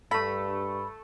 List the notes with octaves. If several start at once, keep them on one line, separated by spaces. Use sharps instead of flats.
G2 A3 A4 B5